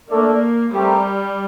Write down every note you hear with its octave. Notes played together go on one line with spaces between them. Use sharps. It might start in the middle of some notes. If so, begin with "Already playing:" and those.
A3 A#3 D4 A4 D5
G3 A3 C4 G4 A#4